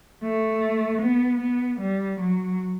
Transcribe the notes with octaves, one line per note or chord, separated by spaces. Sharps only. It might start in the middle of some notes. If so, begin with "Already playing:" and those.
A3
B3
B3
G3
F#3